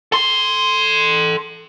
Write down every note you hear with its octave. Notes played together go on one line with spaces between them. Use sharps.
A4 C6